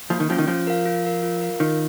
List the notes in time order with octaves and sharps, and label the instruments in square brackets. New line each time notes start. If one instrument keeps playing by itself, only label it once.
[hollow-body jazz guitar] F3 [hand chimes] A#3
[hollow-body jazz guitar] D#3
[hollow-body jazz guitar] F3 [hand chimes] C#4 F4
[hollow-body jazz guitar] D#3
[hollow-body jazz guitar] F3 [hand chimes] F4
[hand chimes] A#4 F5
F4
A#4 F5
F4
A#4 F5
[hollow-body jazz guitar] D#3 [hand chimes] F4